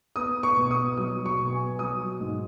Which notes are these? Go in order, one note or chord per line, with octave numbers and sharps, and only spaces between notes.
B3 D#6
C#6
B2
D#6
F#3 D#6
C#6
B2
G#5
F#3 D#6
G#2